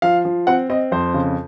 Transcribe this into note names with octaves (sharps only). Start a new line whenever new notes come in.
F3 F5
F3
C4 F#5
C4 D#5
F2 C5
C#3